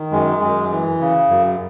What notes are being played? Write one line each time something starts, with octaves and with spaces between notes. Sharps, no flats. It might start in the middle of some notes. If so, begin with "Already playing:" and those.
Already playing: D#3
F#2 G#3
F#2
E3
C#3
F#2